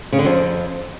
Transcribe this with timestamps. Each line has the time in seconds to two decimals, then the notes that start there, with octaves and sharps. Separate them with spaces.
0.12 C#3
0.19 D3
0.25 F2